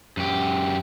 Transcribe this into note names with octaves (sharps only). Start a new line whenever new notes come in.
F#2 G4